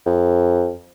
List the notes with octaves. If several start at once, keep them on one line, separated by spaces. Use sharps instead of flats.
F2